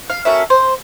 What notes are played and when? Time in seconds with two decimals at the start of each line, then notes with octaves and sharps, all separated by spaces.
0.10 F5
0.25 A#3 C#4 F#4 A4 E5
0.50 C5